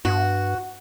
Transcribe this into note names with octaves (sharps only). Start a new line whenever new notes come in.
G2 F#4